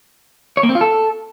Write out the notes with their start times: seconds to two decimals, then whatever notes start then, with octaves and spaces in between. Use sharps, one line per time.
0.57 C#5
0.63 A#3
0.69 C4
0.75 F4
0.81 A4